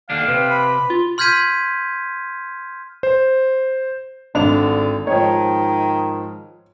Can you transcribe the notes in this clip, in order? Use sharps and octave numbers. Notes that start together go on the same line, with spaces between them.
D#2 D3 D4 F5
C3 C4 B4
B5
F4
C6 F6 G6 G#6 B6 D#7
C5
G#1 D3 D4 F7
G#2 D#3 F3 C#5